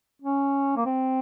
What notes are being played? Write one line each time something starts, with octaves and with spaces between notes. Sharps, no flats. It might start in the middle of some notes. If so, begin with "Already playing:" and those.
C#4
A#3
C4